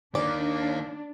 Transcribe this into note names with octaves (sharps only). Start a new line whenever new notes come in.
D#3 A#3 D4 D5